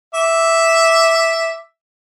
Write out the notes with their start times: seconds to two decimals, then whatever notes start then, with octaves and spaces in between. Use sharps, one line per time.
0.14 E5 D6